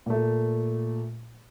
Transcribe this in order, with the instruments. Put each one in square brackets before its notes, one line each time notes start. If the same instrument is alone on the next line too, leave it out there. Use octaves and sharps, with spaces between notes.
[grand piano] A#2 A3